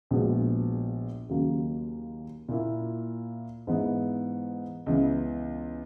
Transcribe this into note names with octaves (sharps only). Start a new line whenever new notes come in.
A#1 A#2 G#3 B3 F#4
D#2 C#3 F#3 A#3
A#2 A#3 E4
G#2 E3 B3
C#2 C#3 E3 B3